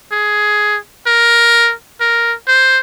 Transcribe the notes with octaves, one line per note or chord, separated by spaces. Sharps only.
G#4
A#4
A#4
C5